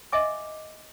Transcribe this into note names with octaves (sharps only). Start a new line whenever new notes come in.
D#5 E5 G#5 D6